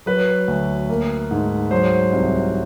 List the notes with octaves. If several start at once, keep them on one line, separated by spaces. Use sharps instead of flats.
F#3 B4
D2
A#3
G#2
F#3 C5
C2